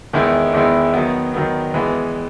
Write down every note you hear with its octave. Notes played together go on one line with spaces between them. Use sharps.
E2 D#3 G#3 B3 E4
E2 D#3 G#3 B3 E4
D#3 F#3 B3
D#3 F#3 B3
E3 G#3 B3